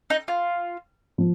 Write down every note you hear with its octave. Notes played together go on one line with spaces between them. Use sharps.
D#4
F4
F3